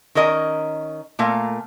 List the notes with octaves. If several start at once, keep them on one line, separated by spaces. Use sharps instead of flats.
D#3 C#4 A#4 D#5
A#2 A3 A#4 F5